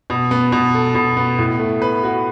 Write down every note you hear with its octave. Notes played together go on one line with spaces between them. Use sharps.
B2
B3
B2
A4
B2
B3
A2
A3
B4
F#4